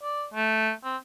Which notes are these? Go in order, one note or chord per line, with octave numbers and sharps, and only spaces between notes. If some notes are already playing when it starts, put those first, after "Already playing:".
D5
A3
C4